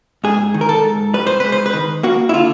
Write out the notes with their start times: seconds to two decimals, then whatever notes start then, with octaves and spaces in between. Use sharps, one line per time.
0.24 G#2 G#4
0.54 D#3
0.61 A#4
0.69 A4
0.84 G#2
1.14 G3 B4
1.27 C5
1.40 G#2 B4
1.52 C5
1.66 B4
1.73 D#3
2.03 A#3 F#4
2.29 E4
2.34 D3 F4